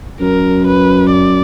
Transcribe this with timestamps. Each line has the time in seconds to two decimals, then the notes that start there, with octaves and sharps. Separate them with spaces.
0.21 F#2 A#4
0.67 B4
1.13 D5